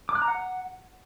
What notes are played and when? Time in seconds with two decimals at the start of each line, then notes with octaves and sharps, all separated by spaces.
0.09 D6
0.15 F#6
0.22 A#5
0.28 F#5